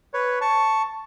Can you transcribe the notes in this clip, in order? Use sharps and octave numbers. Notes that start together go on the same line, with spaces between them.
B4 C#5
A5 C#6